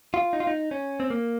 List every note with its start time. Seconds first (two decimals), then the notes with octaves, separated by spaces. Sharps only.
0.14 F4
0.33 D#4
0.40 F4
0.47 D#4
0.71 C#4
1.00 C4
1.10 A#3